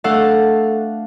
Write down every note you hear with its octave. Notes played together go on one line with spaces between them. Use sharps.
A3 D4 A4 F5 F#5